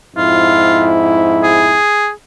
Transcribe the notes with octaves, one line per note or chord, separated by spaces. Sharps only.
F2 G#2 E4 F4
G#4